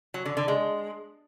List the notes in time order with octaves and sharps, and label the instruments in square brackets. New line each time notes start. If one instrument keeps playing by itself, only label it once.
[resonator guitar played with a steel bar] F#3
D3
D3
G#3